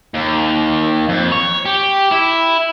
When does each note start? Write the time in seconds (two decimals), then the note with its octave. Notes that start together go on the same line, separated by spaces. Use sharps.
0.14 D#2
1.09 F2
1.32 C#5
1.65 G4
2.12 E4